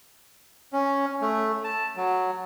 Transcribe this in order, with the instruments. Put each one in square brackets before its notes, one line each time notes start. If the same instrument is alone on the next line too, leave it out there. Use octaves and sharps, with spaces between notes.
[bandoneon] C#4
A3
A5
F#3